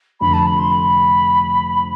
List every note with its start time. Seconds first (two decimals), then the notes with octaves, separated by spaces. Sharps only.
0.20 F1 F2 D3 B5
0.33 A5
0.46 B5
0.59 C6
0.71 B5